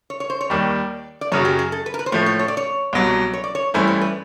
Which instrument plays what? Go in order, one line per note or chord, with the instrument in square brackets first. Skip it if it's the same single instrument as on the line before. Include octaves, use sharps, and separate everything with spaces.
[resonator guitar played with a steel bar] C#5
C#5
C5
C#5
[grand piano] D#2 D#3 G3 [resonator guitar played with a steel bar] D5
[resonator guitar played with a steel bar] D5
[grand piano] F#2 C#3 F#3 [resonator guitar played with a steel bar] C#5
[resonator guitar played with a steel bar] G4
G#4
A4
B4
A#4
B4
C5
[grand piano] A2 F3 A3 [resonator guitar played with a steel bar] C#5
[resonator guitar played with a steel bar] C#5
C#5
D5
C#5
[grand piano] C2 B2 F#3
[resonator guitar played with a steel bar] C#5
D5
C#5
[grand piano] G2 E3 A3 C#4 E4 [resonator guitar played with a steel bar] C5
[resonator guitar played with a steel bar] C5
B4